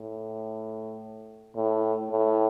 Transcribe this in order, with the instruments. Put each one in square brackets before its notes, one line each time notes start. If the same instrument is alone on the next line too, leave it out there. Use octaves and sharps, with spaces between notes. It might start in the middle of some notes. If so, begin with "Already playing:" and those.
Already playing: [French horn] A2
A2
A2